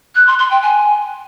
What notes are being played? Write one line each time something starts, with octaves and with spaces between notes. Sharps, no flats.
F#6
C6
C6
G5
G#5